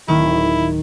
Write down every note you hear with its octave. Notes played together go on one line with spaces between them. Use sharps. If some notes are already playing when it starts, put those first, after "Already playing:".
D1 D#3 E4